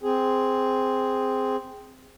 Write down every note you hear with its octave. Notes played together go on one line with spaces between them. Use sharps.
C4 G#4